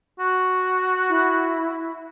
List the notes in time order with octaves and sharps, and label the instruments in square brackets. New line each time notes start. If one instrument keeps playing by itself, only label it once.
[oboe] F#4
[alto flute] E4